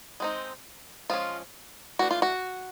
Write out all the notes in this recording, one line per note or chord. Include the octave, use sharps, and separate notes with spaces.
G#3 C4 D#4
F3 G#3 C#4 F4
E3 A3 D4 F#4
F4
F#4